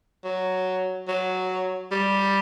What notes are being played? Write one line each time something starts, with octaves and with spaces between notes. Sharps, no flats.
F#3
F#3
G3